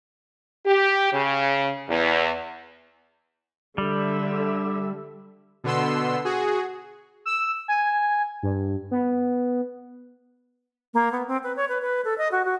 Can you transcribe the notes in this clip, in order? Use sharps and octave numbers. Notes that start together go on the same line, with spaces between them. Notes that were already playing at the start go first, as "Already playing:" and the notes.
G4
C#3
E2
D3 G3 E5
B2 D3 B3 C6 E6
F#4 G#4
E6
G#5
G2
B3
A#3
B3
C4
B4
C#5
B4
B4
A4
D#5
F#4
F#4